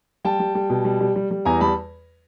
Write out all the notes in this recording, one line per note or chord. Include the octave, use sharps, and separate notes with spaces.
G3 G5 A5
G3
G3
B2
G3
G3
G3
G3
E2 G#5 A#5
G3 A5 B5